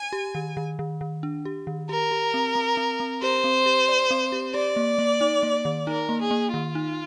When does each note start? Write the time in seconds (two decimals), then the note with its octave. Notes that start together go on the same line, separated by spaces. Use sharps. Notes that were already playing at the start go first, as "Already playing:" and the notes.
Already playing: G#5
0.13 G4
0.35 D#3
0.57 D#3
0.79 D#3
1.01 D#3
1.23 D4
1.45 G4
1.67 D#3
1.89 G4 A#4
2.11 G4
2.34 C4
2.55 C4
2.77 C4
3.00 C4
3.22 G4 C5
3.44 C4
3.66 G4
3.88 D5
4.11 C4
4.32 G4
4.54 G4 D5
4.76 A#3
4.98 A#3
5.21 D#4
5.43 A#3
5.65 D#3
5.87 D#4 A#4
6.09 A#3
6.21 G#4
6.31 A#3
6.53 D#3 F4
6.75 D#4